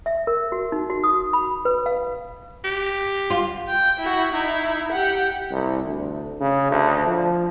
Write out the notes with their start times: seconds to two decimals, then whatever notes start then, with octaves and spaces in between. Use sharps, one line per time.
0.06 E5
0.27 A#4
0.52 F#4
0.72 D#4
0.90 F#4
1.04 D#6
1.33 B5
1.65 B4
1.86 F5
2.64 G4
3.30 F4
3.69 G5
4.00 E4 F#4
4.33 D#4 E4
4.93 G4 F#5
5.51 C2
5.86 D2
6.40 C#3
6.71 D2
7.07 F3